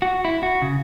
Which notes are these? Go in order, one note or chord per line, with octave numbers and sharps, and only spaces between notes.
F#4
E4
F#4
C#3